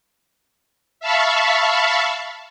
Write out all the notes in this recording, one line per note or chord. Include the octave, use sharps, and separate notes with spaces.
E5 F5 A5 B5 C#6